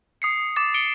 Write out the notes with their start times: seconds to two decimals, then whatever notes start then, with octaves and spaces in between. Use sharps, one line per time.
0.22 D#6 C7 C#7
0.56 D6 A6
0.74 C#7 D7 G7